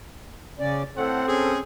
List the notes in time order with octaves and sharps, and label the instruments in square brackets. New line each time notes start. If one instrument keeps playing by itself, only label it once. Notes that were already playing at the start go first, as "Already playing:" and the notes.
[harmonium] C#3 C#4 D5
[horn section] A2 F#5 [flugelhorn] C4 [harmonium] A4
[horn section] C#4 G#4